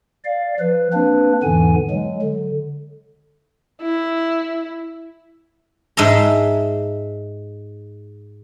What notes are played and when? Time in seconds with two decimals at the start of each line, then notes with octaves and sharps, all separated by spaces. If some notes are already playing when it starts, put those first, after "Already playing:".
0.25 D5 F5
0.60 F3 B4
0.93 A#3 C4 D4 B4
1.43 E2 G#2 D3 E3 B3 G#5
1.90 F#3 G#3
2.22 D3
3.82 E4
5.97 G#2 G#3 D#5 E5 A5 A#5